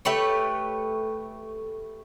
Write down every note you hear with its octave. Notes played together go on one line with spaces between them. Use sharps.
A3 G4 B4 C#5